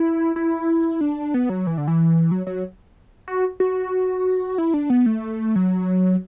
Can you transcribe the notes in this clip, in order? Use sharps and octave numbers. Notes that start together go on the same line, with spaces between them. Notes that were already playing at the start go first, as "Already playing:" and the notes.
Already playing: E4
E4
D4
B3
F#3
E3
D3
E3
F#3
F#3
F#4
F#4
E4
D4
B3
A3
F#3